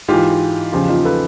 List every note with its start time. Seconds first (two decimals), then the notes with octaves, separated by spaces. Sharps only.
0.08 G#2 E3 F4 G4
0.72 E2 C#3 F3 F4 G4
0.89 D#4 F4
1.05 A4 B4